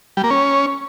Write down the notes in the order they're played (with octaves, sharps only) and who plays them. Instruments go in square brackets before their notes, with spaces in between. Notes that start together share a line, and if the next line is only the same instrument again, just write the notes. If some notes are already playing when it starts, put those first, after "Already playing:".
[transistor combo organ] G3
A#3
C#4